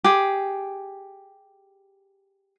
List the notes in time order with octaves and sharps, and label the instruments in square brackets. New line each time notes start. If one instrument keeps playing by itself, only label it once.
[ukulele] G4 G#4